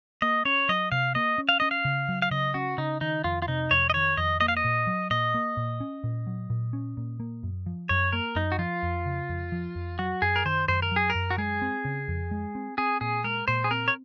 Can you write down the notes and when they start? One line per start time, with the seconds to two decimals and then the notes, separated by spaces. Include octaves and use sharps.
0.22 A#3 D#5
0.45 C#4 C#5
0.69 F#3 D#5
0.92 C3 F5
1.15 A#3 D#5
1.38 C#4
1.49 F5
1.60 C#4 D#5
1.71 F5
1.85 C#3
2.09 F#3
2.22 F5
2.31 C#3 D#5
2.54 C#4 F#4
2.78 C#3 D#4
3.01 D#3 D#4
3.24 F2 F4
3.42 F4
3.48 C3 D#4
3.71 F2 C#5
3.90 D#5
3.94 D#3 C#5
4.17 F2 D#5
4.41 A#3 D#5
4.48 F5
4.57 D#5
4.64 A#2
4.87 F#3
5.11 A#2 D#5
5.34 A#3
5.57 A#2
5.80 C#4
6.04 A#2
6.27 F#3
6.50 A#2
6.73 C#4
6.97 A#2
7.20 A#3
7.43 F#2
7.66 F3
7.89 F#2 C#5
8.13 A#3 A#4
8.35 F#2 D#4
8.52 F#4
8.59 F3 F4
8.83 F2
9.06 C#3
9.29 F2
9.52 F3
9.75 F2
9.99 F#3 F#4
10.22 F#2 G#4
10.36 A#4
10.45 D#3 C5
10.68 F#2 C5
10.82 A#4
10.92 F#3 G#4
11.10 A#4
11.15 F#2
11.30 F#4
11.38 G#3 G#4
11.62 C4
11.85 C#3
12.08 F2
12.31 G#3
12.55 C4
12.78 C4 G#4
13.01 A#2 G#4
13.24 G#3 A#4
13.48 A#2 C5
13.64 G#4
13.71 C4 A#4
13.88 C#5